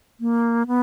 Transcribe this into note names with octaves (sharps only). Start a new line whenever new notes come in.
A#3
B3